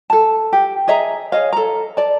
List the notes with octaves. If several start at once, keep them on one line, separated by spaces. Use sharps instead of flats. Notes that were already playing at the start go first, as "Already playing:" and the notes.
A4 A5
G4
G#4 D#5 E5 A#5
G#4 C#5 D#5 F5
A4 A#5
D5 A5